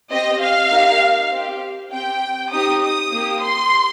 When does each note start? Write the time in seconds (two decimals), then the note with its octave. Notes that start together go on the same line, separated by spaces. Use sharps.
0.11 C4 G4 D#5
0.41 F5
0.71 A#3 D#4 G4
1.31 C4 G4
1.92 C4 G4 G5
2.52 C4 D#4 G4 D#6
2.83 D#6
3.12 A#3 G4
3.42 C6